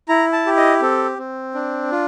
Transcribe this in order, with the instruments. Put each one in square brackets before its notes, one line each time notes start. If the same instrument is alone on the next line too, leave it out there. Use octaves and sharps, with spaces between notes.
[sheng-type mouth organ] E4 A#5
A5
G4
D#5
C4 A4
C4
D4
F4